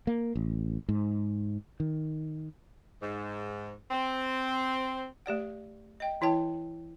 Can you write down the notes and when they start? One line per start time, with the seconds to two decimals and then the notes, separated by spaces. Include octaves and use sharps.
0.07 A#3
0.35 A1
0.89 G#2
1.80 D#3
3.01 G#2
3.91 C4
5.26 A3 G4 D5 F#5
6.00 D#5 G5
6.21 E3 E4 C#5 G5 A5